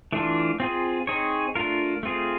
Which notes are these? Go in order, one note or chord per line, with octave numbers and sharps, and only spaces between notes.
E3 A3 D4 F4
C4 F4 G#4
C4 D#4 G#4 C#5
A3 D4 F4 A#4
A3 C4 F4 G#4